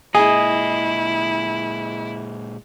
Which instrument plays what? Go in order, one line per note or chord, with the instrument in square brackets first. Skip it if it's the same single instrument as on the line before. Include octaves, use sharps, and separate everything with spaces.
[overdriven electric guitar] A#2 G#3 [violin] E4 [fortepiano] G#4 [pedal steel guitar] D#5